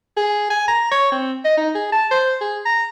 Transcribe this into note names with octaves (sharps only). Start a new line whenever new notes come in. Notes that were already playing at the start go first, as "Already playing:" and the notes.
G#4
G#5
A#5
C#5
C4
D#5
D#4
G#4
A5
C5
G#4
A#5